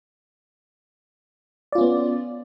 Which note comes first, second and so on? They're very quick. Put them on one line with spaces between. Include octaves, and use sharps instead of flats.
D5 F4 C#4 B3